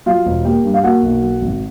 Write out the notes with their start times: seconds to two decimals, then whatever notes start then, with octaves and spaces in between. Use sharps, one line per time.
0.06 F#3 F4 F5
0.25 E1
0.44 A#3 G4 G5
0.64 G2
0.74 F5
0.84 A#3 F#4 F#5
1.02 B1
1.22 F#3
1.41 G#1